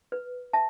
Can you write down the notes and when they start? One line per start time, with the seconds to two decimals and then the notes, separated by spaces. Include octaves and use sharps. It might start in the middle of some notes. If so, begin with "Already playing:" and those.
0.12 B4
0.53 E5 A5